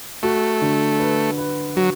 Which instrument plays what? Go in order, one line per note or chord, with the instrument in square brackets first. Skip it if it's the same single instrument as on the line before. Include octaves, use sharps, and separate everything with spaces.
[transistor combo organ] A3 [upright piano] F#4
[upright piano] D3
B4
B4
[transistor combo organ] F#3 [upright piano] F#4